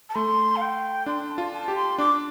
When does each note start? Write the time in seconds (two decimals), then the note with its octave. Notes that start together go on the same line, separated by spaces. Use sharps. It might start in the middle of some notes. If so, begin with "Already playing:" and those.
0.09 A5
0.15 A3 C6
0.56 F5
0.61 G5
1.06 D4 C6
1.30 A5
1.38 F4
1.53 A5
1.68 G4
1.76 C6
1.98 D4 D6